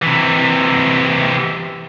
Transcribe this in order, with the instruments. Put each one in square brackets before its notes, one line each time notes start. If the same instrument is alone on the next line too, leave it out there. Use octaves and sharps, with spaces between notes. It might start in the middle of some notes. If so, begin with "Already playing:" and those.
[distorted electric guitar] C3 E3